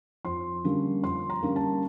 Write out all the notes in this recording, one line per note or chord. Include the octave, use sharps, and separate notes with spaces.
F2 C6
D3 G3 A#3 C#4
F2 C6
A#5
D3 G3 A#3 C#4
A5